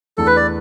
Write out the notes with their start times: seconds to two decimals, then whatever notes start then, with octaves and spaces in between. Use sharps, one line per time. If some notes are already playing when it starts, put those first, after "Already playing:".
0.17 E2 E3 A3 D4 A4
0.27 B4
0.37 D5